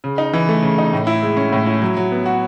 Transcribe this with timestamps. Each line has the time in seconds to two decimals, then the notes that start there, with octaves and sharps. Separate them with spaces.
0.04 C#3
0.18 D#4
0.33 E3
0.49 A3
0.62 C#3
0.78 D#4
0.93 A2
1.07 E4
1.22 G#3
1.37 C#4
1.52 A2
1.66 E4
1.82 F#3
1.97 F#3
2.12 B3
2.26 F#4